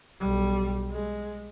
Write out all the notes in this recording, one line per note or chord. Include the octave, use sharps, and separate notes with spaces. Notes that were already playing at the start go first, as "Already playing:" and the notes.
B1 G3
G#3